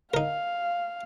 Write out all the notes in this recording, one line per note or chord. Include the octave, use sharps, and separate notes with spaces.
D#4 A#4 F5